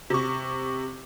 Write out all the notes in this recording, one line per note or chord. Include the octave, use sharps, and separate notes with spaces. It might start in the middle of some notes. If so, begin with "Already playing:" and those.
C3 C#6